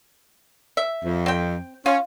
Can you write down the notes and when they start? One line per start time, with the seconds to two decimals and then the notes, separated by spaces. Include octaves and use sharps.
0.77 E5
1.04 F2
1.26 C4 G5
1.86 C#4 F4